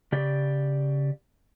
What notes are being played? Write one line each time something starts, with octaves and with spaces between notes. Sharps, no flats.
C#3 G4 D5